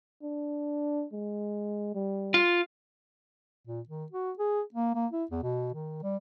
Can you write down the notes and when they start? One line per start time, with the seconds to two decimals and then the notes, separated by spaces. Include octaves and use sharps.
0.22 D4
1.12 G#3
1.95 G3
2.34 F4
3.67 A#2
3.89 D#3
4.12 F#4
4.39 G#4
4.74 A#3
4.95 A#3
5.12 E4
5.31 E2
5.43 B2
5.74 D#3
6.03 G3